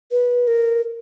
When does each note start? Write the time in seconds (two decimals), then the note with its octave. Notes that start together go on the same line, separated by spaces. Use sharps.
0.11 B4
0.47 A#4